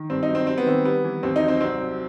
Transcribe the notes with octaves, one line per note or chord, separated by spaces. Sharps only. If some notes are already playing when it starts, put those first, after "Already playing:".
Already playing: D#3
G2 C4
D#4
F#3
C4
G3 C4
B3
D#3 C4
G3 B3
E3
D#2 C4
D#4
F#3
C4
C2 C4
F#3